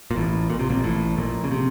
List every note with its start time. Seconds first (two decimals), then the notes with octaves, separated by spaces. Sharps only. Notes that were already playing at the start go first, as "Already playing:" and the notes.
0.11 A#2
0.16 A1 A2
0.50 A#2
0.59 C3
0.69 A#1 A#2
0.84 A1 A2
1.17 A#1 A#2
1.44 C#3
1.51 C3